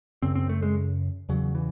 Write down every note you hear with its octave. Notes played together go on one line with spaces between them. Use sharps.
F#2 C#3 C4
C4
A3
G#3
E2 C#3 F#3
E3